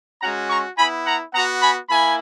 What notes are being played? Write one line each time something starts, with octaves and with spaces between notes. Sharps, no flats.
G#3 C#4 F#4 F#5 A#5
A#5 C#6
B3 E4 G#5 B5
F#5 A#5
B3 F#4 F#5 A#5
G#5 B5
A#3 E4 G#5 B5